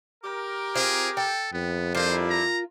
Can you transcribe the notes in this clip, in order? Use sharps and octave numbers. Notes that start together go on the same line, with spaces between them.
G4 A#4
C4 F4 G#4
A4 G5
F2 B3
G3 D4 E4 F4 A#4 C5
A#5